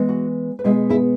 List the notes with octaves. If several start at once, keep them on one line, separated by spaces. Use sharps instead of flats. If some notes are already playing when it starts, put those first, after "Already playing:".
Already playing: E3 G#3 B3
F#4
B4
B2 G#3 B3 E4 G#4
E4 G#4